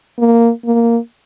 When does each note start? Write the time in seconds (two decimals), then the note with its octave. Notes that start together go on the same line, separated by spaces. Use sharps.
0.19 A#3
0.65 A#3